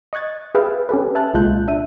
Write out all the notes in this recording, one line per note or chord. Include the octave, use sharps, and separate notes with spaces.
D#5 C#6 F#6 G#6 A6
G#4 B4 E5 F5 G5
C#4 G4 A4 B4
E5 G#5 A5 F6 F#6
C2 A#2 G#3 F4 F#6 G6
D4 E5 D#7